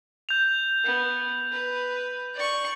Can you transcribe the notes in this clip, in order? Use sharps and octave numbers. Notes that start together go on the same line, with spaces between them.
G6 F7
B3
B4
D5 C#6